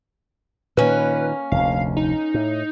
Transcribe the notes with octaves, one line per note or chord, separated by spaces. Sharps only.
A#2 D#3 A#3 C#4 B4
F1 D2 F5
D#4
A2